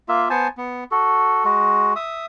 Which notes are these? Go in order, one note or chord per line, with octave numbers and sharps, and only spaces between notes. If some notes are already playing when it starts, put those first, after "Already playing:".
A#3 F4 E5
B3 C5 G#5 A5
B3
F#4 A4
G#3 F#4
E5 D#6